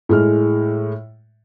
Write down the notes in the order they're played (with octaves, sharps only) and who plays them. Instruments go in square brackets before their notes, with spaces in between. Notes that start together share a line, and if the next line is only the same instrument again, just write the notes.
[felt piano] A2 G#3 F6